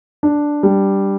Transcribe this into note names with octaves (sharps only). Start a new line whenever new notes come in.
D4
G3